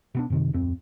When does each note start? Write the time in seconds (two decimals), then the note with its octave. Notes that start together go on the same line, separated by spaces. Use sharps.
0.15 B2 B3 D4
0.30 F#2 C3 D#3
0.53 D1 F2 C4